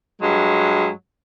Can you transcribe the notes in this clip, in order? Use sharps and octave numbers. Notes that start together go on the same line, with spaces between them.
G2 F#3 G#3